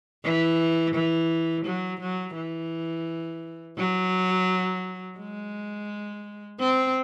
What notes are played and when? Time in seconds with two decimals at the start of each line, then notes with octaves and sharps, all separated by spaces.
0.24 E3
0.95 E3
1.65 F#3
2.00 F#3
2.36 E3
3.77 F#3
5.18 G#3
6.59 C4